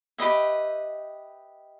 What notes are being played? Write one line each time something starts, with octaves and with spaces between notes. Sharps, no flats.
G4 B4 D#5 E5